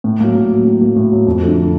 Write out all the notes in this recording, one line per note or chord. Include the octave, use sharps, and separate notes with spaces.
A2
F#3 A#3
A2
F#3 A#3
A2
F#3 A#3
A2
F#3 A#3
F2
D3 F3 A3